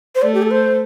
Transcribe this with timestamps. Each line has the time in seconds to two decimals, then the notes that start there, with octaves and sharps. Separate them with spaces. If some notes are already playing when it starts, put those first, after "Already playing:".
0.15 C5
0.22 A3 D5
0.34 G4
0.43 A4
0.51 C5